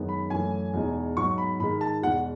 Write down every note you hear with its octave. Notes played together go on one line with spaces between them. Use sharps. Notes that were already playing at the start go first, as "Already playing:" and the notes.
Already playing: F#2 D#3 G#3 B3 D#4
B5
F#2 E3 A3 G#5
E2 B2 G#3 D#4
G#2 F#3 B3 C#6
B5
G#2 D#3 G#3 B5
A5
E2 B2 G#3 F#5